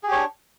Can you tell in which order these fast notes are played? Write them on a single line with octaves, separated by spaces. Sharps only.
G#4 G4 C#5 D4